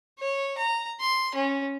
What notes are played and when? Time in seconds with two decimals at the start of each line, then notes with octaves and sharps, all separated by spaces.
0.19 C#5
0.58 A#5
1.00 C6
1.34 C#4